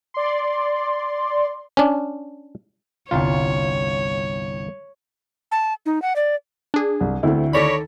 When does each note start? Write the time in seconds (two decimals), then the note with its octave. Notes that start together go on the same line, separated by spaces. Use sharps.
0.14 D5 C6
1.77 C#4 D4
3.11 G1 C2 F4 C#5
5.52 A5
5.86 D#4
6.02 F#5
6.16 D5
6.74 D4 G#4
7.01 C2
7.23 D2 A3 C4 E4
7.53 D#3 A4 C#5 D5 B5 A#6 B6